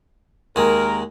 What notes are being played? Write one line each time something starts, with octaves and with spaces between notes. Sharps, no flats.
D#2 G#3 A#4